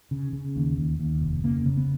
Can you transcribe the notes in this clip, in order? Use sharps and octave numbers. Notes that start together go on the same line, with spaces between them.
C#3
C#3
D#2
D#2
D#2
F1
C#3 A#3
C#3
B3